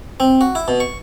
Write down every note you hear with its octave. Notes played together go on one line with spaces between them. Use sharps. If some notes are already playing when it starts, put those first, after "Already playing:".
C4
F#4
E4
B2
C#6